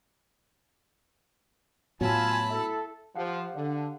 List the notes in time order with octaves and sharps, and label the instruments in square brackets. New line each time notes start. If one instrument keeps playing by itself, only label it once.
[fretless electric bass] A2 B3 [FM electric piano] F#3 E6 [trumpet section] F4 G#5 [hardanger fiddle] A5 B5
[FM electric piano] E4 [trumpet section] A4
[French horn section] F3 [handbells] G4 F5 F#5
[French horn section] D3